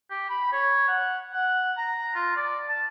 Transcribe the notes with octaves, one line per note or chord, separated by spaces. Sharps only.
G4
B5
C#5
F#5
F#5
A#5
F4
D5
A5